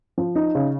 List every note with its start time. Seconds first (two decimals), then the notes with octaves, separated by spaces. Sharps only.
0.18 F3
0.35 D#4
0.55 C#3